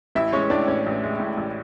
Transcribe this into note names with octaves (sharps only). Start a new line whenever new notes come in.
A1 E4 E5
G#3 C#4 C#5
A2 D4 D5
A1 C#4 C#5
A1
G#3
A2
A1